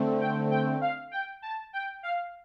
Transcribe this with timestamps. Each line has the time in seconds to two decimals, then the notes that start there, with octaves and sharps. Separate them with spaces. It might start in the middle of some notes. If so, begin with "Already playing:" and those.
Already playing: D3 A3 C4
0.21 G5
0.51 G5
0.81 F5
1.11 G5
1.42 A5
1.73 G5
2.03 F5